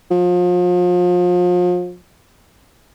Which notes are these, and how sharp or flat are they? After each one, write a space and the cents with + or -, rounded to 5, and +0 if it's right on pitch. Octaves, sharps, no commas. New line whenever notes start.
F3 +35